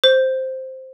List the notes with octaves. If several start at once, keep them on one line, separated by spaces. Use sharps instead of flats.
C5